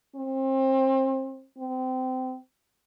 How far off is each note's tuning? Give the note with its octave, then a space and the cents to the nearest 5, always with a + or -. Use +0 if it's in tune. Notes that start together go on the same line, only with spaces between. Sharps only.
C4 +30
C4 -25